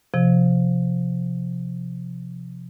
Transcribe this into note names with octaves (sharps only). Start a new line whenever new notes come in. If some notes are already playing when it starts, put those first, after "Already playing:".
C3 F3